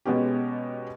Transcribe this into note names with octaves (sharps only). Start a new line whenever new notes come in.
B2 G#3 B3 C#4 G4